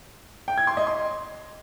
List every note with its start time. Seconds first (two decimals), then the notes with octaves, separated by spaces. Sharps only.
0.48 G5
0.58 G#6
0.67 C6
0.77 D#5
0.87 C6